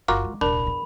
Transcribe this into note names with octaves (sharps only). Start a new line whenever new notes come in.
F#1 F4 F#4 A#4 D6
G#3
D#1 C2 D4 A#4 B5
E2